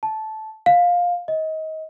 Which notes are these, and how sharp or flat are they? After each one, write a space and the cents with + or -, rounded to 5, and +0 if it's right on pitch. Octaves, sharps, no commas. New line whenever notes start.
A5 -15
F5 +15
D#5 +25